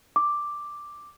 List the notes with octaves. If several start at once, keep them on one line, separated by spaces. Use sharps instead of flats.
D6